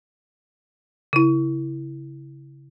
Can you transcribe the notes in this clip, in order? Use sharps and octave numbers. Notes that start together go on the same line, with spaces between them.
C#3 E4